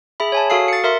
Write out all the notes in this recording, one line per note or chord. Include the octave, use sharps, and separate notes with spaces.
G#4 E5 B5
C#5 G#5 A5
F#4 A4 F5 D#6 C7
A6 C#7
A#4 E5 C6